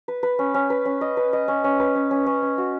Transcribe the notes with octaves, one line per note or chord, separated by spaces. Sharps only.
B4
B4
C#4
C#4
B4
C#4
D#5
B4
D#5
C#4
C#4
B4
C#4
C#4
C#4
C#4
F#4